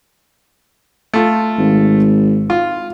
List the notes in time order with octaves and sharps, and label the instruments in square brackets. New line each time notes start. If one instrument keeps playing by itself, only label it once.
[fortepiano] A3 F4
[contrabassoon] G#1
[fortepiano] F4